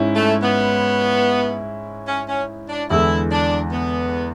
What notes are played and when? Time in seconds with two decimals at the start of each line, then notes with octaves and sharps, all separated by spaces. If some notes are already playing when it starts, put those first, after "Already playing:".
Already playing: G#2 G#3 C#4 E4
0.15 A3
0.43 B3
2.07 C#4
2.28 C#4
2.69 D4
2.90 E2 D3 G#3 E4
3.31 D4
3.72 B3